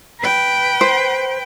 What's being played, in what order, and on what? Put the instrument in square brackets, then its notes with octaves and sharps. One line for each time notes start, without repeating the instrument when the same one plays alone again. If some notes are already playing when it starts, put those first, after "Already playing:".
[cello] B4 G5
[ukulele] C5